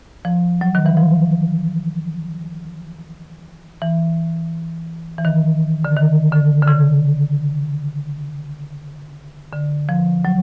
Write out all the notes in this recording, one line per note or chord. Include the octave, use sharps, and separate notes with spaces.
F3
F#3
D#3
E3
F3
E3
E3
D#3
D3
D#3
D3
D3
C#3
D3
F3
F#3